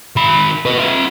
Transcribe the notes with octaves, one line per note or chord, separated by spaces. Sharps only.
D#3 B5
B4 D#5
F4 E5